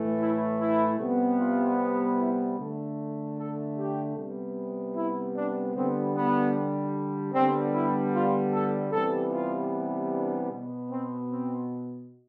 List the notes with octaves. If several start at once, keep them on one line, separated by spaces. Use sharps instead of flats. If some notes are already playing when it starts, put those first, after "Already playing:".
Already playing: A2 E3 A3
E4
E4
C3 G3 B3
F4
E4
D3 A3
A4
G4
C3 G3 B3
E4
D4
D3 G3 B3 C4
B3
D3 G3 B3 C4
E4
F4
A4
C3 E3 G3 B3 A4
F4
D4
B2 B3
C4
C4